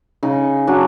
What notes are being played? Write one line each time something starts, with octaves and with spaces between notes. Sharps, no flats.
C#3 D#4
F#3 D4